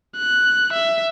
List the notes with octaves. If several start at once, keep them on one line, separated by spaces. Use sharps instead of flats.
F#6
E5